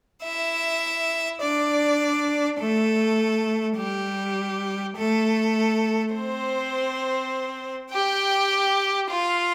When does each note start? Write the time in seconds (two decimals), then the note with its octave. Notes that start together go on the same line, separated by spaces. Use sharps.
0.23 E4 E5
1.41 D4 D5
2.60 A3 A4
3.77 G3 G4
4.96 A3 A4
6.14 C4 C5
7.92 G4 G5
9.09 F4 F5